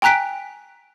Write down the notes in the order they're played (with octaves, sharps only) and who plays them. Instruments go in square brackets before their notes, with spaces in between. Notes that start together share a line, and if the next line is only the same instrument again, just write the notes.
[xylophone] G5 G#5 A#5 F#6 B6 D7